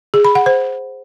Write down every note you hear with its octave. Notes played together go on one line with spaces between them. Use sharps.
G#4
B5
F#5
C5